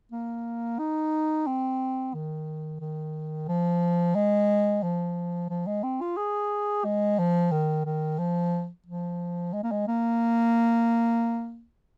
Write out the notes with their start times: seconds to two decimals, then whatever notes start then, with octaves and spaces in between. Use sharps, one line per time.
0.12 A#3
0.79 D#4
1.47 C4
2.14 D#3
2.80 D#3
3.48 F3
4.15 G#3
4.83 F3
5.50 F3
5.67 G#3
5.83 C4
6.01 F4
6.17 G#4
6.85 G#3
7.19 F3
7.52 D#3
7.86 D#3
8.19 F3
8.86 F3
9.53 G#3
9.64 A#3
9.72 G#3
9.88 A#3